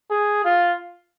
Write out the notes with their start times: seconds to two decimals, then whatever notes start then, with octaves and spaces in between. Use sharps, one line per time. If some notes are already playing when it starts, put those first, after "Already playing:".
0.10 G#4
0.45 F4